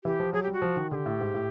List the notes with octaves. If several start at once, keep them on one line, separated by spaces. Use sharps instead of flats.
E3 G4
F3
F#3 G#4
G4
G3
F#4
F3
D#3
D3 G4 G#4
A2
G#2
A2